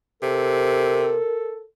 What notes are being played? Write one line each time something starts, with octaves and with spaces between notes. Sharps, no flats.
C3 A4 A#4